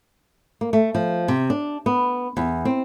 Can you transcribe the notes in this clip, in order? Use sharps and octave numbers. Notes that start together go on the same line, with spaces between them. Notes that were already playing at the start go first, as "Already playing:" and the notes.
A#3
A3
F3
C3
D4
B3
E2
C4